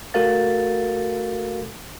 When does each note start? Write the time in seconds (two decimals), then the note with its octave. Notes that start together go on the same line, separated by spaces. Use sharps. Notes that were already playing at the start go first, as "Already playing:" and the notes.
0.14 A3 F#4 A4 A#4 F5 A6